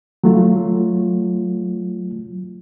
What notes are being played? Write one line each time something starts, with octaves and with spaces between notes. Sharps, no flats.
F#3 A3 F4